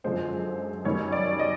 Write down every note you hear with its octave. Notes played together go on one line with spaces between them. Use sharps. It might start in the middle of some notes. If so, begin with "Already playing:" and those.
F#2 D3 F3 G#3 C5
F#2 D#3 G3 C#5
D5
D#5